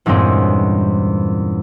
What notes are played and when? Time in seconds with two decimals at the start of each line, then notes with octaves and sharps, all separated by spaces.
0.06 E2 G2 A#2 G#3 C4 C#4